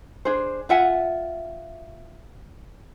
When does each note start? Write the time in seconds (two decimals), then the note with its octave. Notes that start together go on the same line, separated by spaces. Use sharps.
0.25 D4 G#4 C5
0.69 F4 E5 F#5 G#5